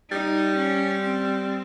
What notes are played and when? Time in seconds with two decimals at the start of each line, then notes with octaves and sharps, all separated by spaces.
0.11 G3 D#4
0.56 C#4
1.01 C4